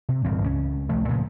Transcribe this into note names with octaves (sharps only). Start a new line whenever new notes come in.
C3
D1 G2 E3 C4
C#2 A3 C#4
A1 C3 F3 A3
A#2 C#3 F3